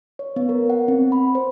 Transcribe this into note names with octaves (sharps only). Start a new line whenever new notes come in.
C#5
B3
A#4
F#5
C4
B5
C5